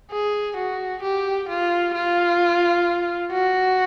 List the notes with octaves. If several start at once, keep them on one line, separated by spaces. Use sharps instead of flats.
G#4
F#4
G4
F4
F4
F#4